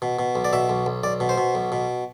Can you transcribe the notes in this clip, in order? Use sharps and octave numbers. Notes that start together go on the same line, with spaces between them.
B2
B2
B1
D5
B2 E5
B1
B1
B1 D5
B2
C5
B2
B1
B2